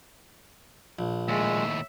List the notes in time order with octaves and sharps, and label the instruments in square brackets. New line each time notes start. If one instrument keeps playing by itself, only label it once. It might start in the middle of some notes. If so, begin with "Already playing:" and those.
[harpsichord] A#1
[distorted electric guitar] D#2 A2 [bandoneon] G#3 [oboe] E5